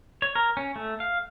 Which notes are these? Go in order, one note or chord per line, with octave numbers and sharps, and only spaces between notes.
C#5
A#4
C#4
A3
F5